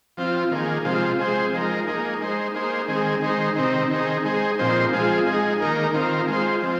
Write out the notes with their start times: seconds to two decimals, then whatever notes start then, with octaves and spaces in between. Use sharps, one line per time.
0.17 F3 C4 F4
0.51 D#3 A#3 G#4
0.84 C3 F3 G#3 F4
1.19 G#3 C4 G#4 C5
1.53 F3 G#3 D#4 A#4
1.87 A#3 D#4 G#4
2.20 G#3 D#4 C5
2.54 A#3 D#4 G#4 C5
2.88 D#3 G#3 C4 G#4
3.22 D#3 G#3 D#4 C5
3.56 C3 D#3 C4 D#4
3.91 D#3 C4 D#4 G#4
4.24 G#3 D#4 G#4 C5
4.59 A#2 F3 C4 D#4 C5
4.92 F3 G#3 C4 F4 G#4
5.26 G#3 D#4 G#4
5.60 D#3 A#3 D#4 A#4
5.94 D#3 C4 F4 A#4
6.28 G#3 F4 C5
6.62 F3 C4